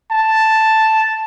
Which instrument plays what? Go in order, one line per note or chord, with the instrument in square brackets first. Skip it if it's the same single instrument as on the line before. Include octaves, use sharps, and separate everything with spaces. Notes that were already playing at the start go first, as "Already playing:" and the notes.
[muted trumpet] A5